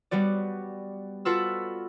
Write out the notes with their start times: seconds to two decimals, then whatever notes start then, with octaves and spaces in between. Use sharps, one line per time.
0.11 G3 B3 F#4 D5
1.25 F4 F#4 A4 B4 B5 E6